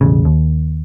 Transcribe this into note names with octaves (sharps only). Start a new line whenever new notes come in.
E1 A1 C#3
D#2